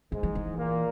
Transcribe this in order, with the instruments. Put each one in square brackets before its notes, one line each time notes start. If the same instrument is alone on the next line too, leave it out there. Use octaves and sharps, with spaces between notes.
[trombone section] G#2 G#3 [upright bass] E3
[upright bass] F3
E3
[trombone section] A#2 A#3